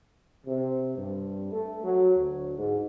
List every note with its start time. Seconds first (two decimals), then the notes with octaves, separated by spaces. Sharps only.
0.46 C3
0.97 G2
1.51 A3
1.83 F#3
2.17 D2
2.58 G#2